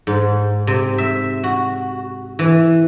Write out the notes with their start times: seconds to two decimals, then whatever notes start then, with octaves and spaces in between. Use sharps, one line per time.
0.07 G#2
0.67 C3
0.98 E5
1.44 F#4
2.39 E3